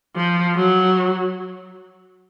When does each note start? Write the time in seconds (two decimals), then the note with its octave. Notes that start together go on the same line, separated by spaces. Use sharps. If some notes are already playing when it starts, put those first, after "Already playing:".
0.17 F3
0.56 F#3